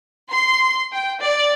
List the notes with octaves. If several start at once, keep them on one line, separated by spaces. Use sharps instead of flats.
C6
G5
D5